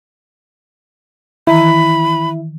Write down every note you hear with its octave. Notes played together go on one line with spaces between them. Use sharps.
D#3 E3 E4 A#5 B5